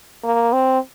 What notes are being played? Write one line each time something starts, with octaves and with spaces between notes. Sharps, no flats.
A#3
C4